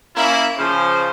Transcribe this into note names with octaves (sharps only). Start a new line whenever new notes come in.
A#3 C#4 E4
C#3 F3 C5